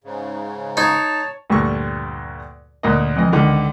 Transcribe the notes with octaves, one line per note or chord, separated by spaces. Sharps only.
G#2 C#3
D#4 C#5 A5
D2 G2 A#2 A3 C#6
D2 A#2 A#4 D#5
F2 E3 D#5
C#2 D3 D#3